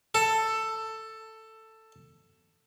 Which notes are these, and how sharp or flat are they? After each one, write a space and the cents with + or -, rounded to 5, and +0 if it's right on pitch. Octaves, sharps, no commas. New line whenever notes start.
A4 +10